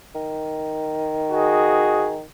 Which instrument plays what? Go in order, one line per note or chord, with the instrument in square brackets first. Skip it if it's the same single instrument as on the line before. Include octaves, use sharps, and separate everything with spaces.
[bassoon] D#3
[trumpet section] F#4 G#4 D#5